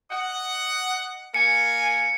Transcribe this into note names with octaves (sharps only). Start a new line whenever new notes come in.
D#5 F#5
A#3 G#5 C#7